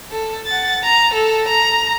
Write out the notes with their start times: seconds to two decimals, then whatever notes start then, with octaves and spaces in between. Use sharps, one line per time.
0.11 A4
0.46 F#5 A6
0.83 A#5
1.14 A4
1.49 A#5